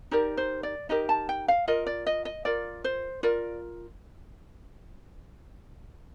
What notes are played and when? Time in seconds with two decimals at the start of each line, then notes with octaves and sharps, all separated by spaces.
0.11 D#4 G4 A#4 D5
0.37 C5
0.63 D5
0.89 D#4 G4 A#4 D#5
1.09 A5
1.29 G5
1.48 F5
1.68 F4 A#4 D#5
1.87 D5
2.06 D#5
2.25 D#5
2.45 F4 A#4 D5
2.84 C5
3.23 F4 A#4 D5